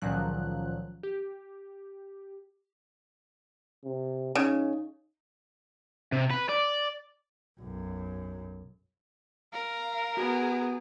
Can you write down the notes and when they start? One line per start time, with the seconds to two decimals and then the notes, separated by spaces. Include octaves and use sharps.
0.02 C#2 A#2 D#3 F3 F#3 F#6
1.03 G4
3.84 C3
4.35 C#3 D#4
6.12 C3
6.30 B4
6.49 D5
7.60 B1 F#2
9.53 A#4 F5
10.17 B3 F#4 G#4